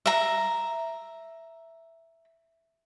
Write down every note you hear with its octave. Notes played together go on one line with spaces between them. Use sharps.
E5 A#5